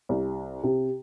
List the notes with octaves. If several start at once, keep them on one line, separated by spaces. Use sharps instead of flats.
C2
C3